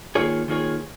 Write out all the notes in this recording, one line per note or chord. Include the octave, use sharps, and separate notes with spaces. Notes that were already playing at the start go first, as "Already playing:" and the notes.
D#3 A#3 F4 G#4 C#5
D#3 A#3 F4 G#4 C#5